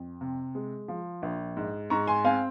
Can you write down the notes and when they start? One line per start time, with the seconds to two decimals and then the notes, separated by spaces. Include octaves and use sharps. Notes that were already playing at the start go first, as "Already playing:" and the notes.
Already playing: F2
0.21 C3
0.55 G#3
0.88 F3
1.22 A#1
1.57 G#2
1.90 G#2 A#5 C#6
2.07 G#5 C6
2.24 C4 F5 G#5